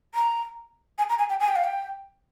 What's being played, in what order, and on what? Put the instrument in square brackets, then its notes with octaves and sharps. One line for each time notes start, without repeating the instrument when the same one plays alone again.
[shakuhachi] A#5
G#5
A#5
G#5
G5
G#5
G5
F5
G5